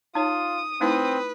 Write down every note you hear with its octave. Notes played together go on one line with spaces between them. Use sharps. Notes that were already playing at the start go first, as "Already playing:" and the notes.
D#4 F4 C#5 A5 D#6
A3 C4 D#4 E4 B4